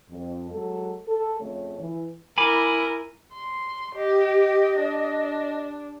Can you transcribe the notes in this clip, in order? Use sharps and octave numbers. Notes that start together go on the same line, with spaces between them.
F2
F#3 G#3 A4
A4
F2 C#3 A3 C#5
E3
E4 A#4 G#5 B5 D6
C6
G4 D#5
D4